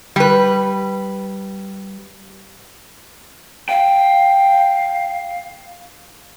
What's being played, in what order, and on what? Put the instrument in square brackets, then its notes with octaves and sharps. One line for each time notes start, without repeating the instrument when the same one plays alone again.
[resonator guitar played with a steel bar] G3 B4
[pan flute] F5 [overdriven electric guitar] G5